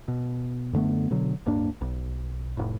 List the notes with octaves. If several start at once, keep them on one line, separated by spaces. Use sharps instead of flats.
B2
F#2 D3 A3 B3
B2 D3 F#3
D1 G2 A#3 D4
B1
F1 A2